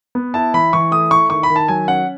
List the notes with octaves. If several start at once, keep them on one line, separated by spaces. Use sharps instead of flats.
B3
E4 A5
E3 B5
E3 C#6
A3 D#6
E4 C#6
D#3 C#6
B5
D#3
A5
F#3 G#5
C#4 F#5